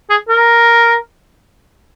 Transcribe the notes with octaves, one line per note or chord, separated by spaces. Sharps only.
G#4
A#4